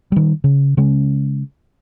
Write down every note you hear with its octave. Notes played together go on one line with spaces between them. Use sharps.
D#3 G3
C#3
C#3 G#3 C#4